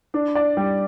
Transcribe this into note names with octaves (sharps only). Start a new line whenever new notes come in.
D4
D5
G3